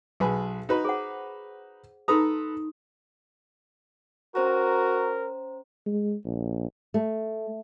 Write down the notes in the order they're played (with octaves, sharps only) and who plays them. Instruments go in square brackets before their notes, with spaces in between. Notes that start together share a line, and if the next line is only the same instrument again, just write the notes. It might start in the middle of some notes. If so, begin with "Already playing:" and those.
[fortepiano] B1 G#4 B4
D#4 F#4 B4
[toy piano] G#4 C5 F#5
[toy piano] D#4 C6 D#6 [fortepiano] A4 B4 A#5
[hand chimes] C#4 C5 A#5 [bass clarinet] F#4 [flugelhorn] A#4
[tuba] G#3
A#1
[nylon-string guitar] A3